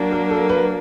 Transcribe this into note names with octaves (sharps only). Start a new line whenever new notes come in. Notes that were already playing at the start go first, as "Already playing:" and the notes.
Already playing: F#3 A#3 D4
A#4
A4
B4